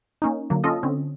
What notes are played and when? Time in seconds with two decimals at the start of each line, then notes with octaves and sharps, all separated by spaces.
0.22 A#3 C#4 D#4
0.50 D3 F#3 A#3
0.64 C#4 F4 A4 D#5
0.83 D3 C4 C#4